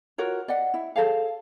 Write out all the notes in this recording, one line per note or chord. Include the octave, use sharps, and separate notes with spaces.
F4 F#4 A#4 C#5
D5 D#5 F#5
E4
G#4 A4 C#5 F5